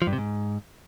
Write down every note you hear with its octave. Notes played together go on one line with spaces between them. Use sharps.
F3
G2
C3
G#2